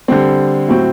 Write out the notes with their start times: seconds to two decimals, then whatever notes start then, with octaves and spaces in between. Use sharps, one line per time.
0.08 D3 G3 C4
0.68 A2 F#3 C4 F#4